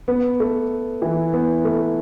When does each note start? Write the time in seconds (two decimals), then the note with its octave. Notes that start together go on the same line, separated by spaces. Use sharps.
0.08 B3 B4
0.40 A3 A4
1.02 E3 E4
1.33 B3
1.65 A3